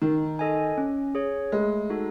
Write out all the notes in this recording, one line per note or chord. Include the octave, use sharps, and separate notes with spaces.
D#3 D#4
A4 D#5 G#5
C#4
G#4 C#5
G#3 A3
D#4 F#4 A4